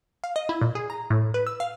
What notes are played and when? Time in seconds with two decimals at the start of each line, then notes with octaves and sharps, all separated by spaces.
0.24 F5
0.36 D#5
0.49 E4
0.61 A#2
0.75 G#4
0.90 A#5
1.10 A2
1.34 B4
1.47 E6
1.60 F5